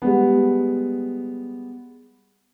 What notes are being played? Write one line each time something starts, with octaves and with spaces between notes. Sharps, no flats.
G3 G#3 B3